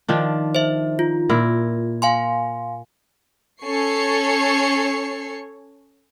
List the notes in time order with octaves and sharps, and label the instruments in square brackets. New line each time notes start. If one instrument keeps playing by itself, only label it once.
[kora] D#3 F3 D4
[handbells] C5 E5
F4
[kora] A#2 E4 A#4
[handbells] F5 G#5 C6
[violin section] C#4 A4 C#5 C#6 C7 C#7